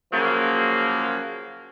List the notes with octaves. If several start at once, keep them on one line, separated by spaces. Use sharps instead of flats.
C#3 F3 F#3 A#3